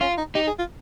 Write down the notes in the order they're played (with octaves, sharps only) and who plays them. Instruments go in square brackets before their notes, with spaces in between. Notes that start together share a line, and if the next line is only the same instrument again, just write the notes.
[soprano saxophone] C#4 [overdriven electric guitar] F4
[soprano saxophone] D#4
[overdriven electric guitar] D#4 [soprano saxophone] G4
[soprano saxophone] G#4
F4